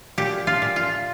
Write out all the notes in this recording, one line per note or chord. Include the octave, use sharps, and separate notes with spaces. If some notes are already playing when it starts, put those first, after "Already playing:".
A#2 G4
F4
A#2
F4